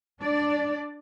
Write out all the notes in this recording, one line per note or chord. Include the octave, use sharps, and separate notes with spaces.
D4 D5